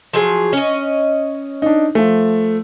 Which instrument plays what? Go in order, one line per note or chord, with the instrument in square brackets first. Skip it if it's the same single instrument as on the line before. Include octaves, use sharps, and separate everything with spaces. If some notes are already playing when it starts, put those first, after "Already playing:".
[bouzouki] F3 F#3 G#4
C#4 D#5
[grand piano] D4 D#4
F3 A3